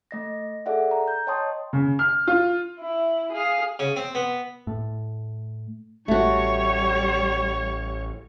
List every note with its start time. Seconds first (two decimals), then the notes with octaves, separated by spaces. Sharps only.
0.11 A3 D#5 A#6
0.66 G#4 A4 D5 E5 F#5
0.91 A#5
1.08 G6
1.27 C#5 D#5 G5 A5 C6 D#6
1.73 C#3
1.99 F6
2.27 F4
2.79 E4
3.32 G#4 F5
3.79 C#3
3.96 C4
4.15 B3
4.67 A2
6.08 A1 G3 A3 F#4 C#5